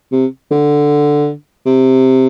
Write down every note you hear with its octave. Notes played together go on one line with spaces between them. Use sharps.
C3
D3
C3